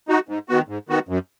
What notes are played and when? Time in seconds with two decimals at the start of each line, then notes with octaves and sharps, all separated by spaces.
0.08 D#4 F#4
0.29 G#2
0.49 D#3 B3 F#4
0.68 G#2
0.89 D#3 B3 F#4
1.09 F#2